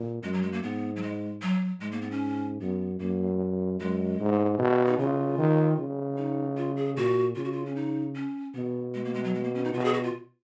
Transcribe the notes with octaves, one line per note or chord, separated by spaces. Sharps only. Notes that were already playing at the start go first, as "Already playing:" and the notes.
Already playing: A#2
F#2 G#3
F#3
G#3
A#3
G#2 B3
F#3
G#3
F#3
G#2 G#3
A#3
B3
C#4
F#2 B3
F#2 A#3
F#2 G#3
G#2
B2
D#4
C#3 F4
D#3
C#3
D#4
F4
G#4
A#2 F#4
C#3 F4
F#4
F4
C#4
D#4
C#4
B2 B3
G#3
A#3
G#3
F#3
G#3
A#3
C#4
D#4
B2 F4
F#4
G#4
F#4
F4